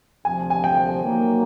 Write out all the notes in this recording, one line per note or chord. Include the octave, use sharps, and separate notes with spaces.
D2 C3 F3 G#5
G#5
G5
D#3 F#3 A#3